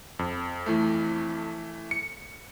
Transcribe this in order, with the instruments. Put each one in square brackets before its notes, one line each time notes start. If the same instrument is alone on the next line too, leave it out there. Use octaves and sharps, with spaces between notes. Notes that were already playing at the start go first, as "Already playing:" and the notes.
[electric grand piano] F2
[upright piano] E3 A3
[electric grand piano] C#7